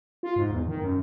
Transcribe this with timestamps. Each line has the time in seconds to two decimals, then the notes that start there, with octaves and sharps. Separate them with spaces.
0.23 F4
0.36 G#2
0.51 E2
0.68 D#3
0.82 F#2